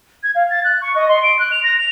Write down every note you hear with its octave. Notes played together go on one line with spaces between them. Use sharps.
G#6
F5
A6
F#6
C#6
D#5
C6
D7
F#6
F7
A#6
F7